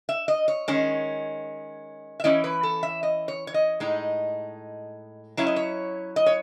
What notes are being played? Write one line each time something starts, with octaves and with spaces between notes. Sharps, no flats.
E5
D#5
C#5
D#3 G#3 C#4
E5
E3 A3 C#4 E4 D#5
B4
A4
E5
D#5
C#5
C#5
D#5
A2 G#3 D#4
F#3 C#4 E4 C#5
D#5
C#5
D#5
C#5